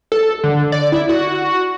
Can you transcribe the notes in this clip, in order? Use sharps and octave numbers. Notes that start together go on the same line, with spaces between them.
A4
D3
D5
E4
F#4